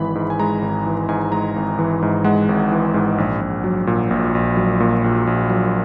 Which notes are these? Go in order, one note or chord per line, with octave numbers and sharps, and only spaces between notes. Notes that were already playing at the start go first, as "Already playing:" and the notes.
Already playing: G#1 E3 G#3 B5
G#2
G#5
G#3 A#5
G#1
E3
G#2 G#5
G#3 A#5
G#1
E3
G#2
G#3 F#5
G#1
E3
G#2
A#1
A#1
F#3
A#2
A#1
A#1
F#3
A#2
A#1
A#1
F#3